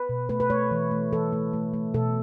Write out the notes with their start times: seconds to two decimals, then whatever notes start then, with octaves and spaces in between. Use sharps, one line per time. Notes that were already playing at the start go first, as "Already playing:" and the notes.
Already playing: B4
0.09 B2
0.29 A3 B4
0.40 B4
0.50 A3 C#5
0.71 E3
0.91 A3
1.13 E3 A4
1.33 A3
1.53 A3
1.74 A3
1.94 B2 A4